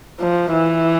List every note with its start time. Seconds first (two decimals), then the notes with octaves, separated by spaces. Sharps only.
0.20 F3
0.53 E3